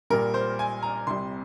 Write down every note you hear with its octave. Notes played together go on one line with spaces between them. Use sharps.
A#1 A#2 G3 A#4
C5
G#5
A#5
C2 C3 G3 C6